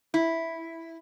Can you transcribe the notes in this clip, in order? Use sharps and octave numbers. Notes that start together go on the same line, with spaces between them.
E4